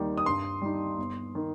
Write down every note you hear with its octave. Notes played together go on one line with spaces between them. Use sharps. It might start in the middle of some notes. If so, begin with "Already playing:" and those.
Already playing: D#2 D#3 G3
D#6
G2 C6
G3 D#4
G1
D#3